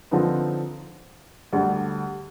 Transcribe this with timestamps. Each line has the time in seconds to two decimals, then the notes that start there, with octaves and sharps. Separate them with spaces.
0.11 D3 F3 C4 D#4 B4
1.53 D2 D3 G3